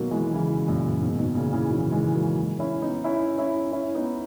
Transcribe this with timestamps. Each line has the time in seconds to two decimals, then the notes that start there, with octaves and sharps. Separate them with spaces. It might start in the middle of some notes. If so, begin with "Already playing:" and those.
Already playing: B2 D#3 F#3 A#3
0.11 E3 G#3
0.33 C#3 E3
0.68 F#2 A#2
1.02 G#2 B2
1.19 G#2 B2
1.35 A#2 C#3
1.53 C#3 E3
1.69 D#3 F#3
1.91 E3 G#3
2.14 F#3 A#3
2.59 C#4 E4
2.82 B3 D#4
3.04 C#4 E4
3.38 C#4 E4
3.72 C#4 E4
3.95 B3 D#4